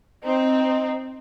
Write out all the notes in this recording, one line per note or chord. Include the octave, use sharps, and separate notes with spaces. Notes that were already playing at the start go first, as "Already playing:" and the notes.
C4 D#4